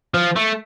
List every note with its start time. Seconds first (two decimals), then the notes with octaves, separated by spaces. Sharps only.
0.14 F3
0.36 A3